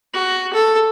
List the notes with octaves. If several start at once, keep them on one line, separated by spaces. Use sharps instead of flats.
F#4
A4